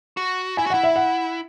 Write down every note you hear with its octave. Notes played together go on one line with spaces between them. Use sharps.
F#4
E4 G#5
F#4
E4 F#5
E5
F#5